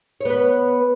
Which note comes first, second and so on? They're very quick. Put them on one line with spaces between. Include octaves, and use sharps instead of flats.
C#5 B3 B4